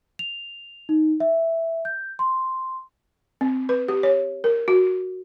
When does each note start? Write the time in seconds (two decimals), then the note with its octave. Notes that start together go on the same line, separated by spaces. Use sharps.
0.19 F7
0.89 D#4
1.20 E5
1.85 G6
2.19 C6
3.41 C4
3.69 B4
3.88 G4
4.03 C#5
4.44 A#4
4.68 F#4